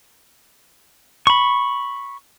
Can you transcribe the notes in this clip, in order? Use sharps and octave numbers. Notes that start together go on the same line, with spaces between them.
B5 C#6